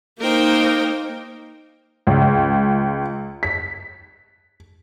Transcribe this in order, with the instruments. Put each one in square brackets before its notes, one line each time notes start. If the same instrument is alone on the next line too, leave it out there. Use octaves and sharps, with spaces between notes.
[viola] A#3 D#4 [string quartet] A#4 C5 G5
[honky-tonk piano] C#2
B6